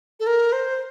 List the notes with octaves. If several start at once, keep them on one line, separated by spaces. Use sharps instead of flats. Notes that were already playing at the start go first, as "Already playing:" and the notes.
A4
A#4
C5